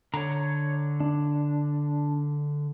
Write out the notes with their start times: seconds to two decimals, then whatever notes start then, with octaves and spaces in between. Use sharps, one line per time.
0.14 D3 C#5 A#5
1.00 D4